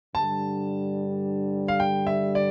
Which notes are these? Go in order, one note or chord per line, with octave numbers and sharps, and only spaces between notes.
G2 D3 G3 A5
F5
G5
E5
D5